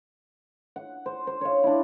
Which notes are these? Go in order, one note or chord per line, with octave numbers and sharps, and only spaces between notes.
F#5
C5
C5
C#5 F5
D4 E4